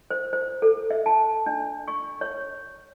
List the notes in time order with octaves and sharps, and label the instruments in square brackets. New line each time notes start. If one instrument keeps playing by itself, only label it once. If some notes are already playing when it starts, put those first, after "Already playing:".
[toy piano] C5
C5
A4
E5
A5
D4
C#6
C#5